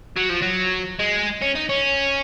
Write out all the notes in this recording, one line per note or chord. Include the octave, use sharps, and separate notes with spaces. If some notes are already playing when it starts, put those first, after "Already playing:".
F#3
F3
F#3
G#3
C#4
D#4
C#4